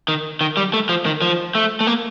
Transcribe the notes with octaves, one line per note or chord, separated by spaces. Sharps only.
D#3
D#3
G3
A3
F3
D#3
F3
A3
A3
A#3